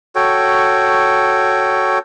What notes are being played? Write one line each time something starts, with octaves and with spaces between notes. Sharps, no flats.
F#4 A4 C#5 G5